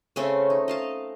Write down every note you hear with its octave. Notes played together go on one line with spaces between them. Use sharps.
C#3 A3 C4 C#4
D#4
D#5 F5 A5